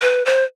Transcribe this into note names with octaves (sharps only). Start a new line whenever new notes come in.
B4
C5